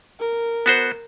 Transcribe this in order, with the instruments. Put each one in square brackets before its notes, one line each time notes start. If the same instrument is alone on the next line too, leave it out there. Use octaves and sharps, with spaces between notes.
[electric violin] A#4
[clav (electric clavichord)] B3 F#4 C5